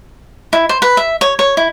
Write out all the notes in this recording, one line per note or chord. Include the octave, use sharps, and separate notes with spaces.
E4
C5
B4
E5
C#5
C#5
E4